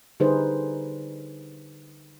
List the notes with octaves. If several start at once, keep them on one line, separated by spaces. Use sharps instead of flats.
D3 G3 D#4 G#4 B4 C5